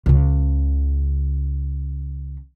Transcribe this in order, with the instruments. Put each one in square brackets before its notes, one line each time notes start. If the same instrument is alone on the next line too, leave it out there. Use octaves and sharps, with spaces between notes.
[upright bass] C#2 C#3